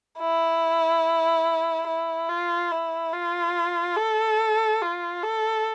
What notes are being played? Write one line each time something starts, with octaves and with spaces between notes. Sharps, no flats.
E4
E4
F4
E4
F4
A4
F4
A4